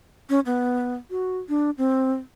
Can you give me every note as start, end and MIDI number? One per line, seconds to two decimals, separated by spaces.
0.30 0.40 61
0.46 0.95 59
1.11 1.38 66
1.49 1.70 62
1.78 2.12 60